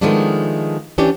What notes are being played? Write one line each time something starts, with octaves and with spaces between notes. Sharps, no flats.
D#3 F3 G#3 A3 B3 D4
E3 C#4 D4 G4